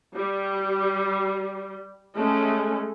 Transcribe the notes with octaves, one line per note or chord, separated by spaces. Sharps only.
G3
G#3 A3 C#4 A4